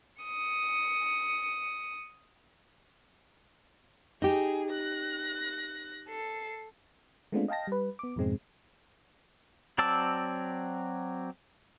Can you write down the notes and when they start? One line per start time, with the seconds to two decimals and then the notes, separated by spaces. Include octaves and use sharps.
0.22 D#6 C#7
4.22 D#4 G4 G#4
4.71 F#6 A#6
6.09 A4 C7
7.32 G#3 A3 B3 C4 D4 F4
7.48 D#5 F5 G5 A5 A#6
7.67 G3 B4
7.99 B3 D6
8.16 F2 G#2 B2 G#3 C4
9.78 F#3 C4 D5 A5 E6